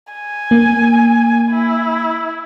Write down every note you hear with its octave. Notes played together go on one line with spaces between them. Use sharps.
G#5
A#3
E4